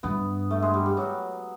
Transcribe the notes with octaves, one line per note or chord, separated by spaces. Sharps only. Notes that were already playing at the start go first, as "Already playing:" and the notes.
G2 B3
A3
G#3
G3
G3
F#3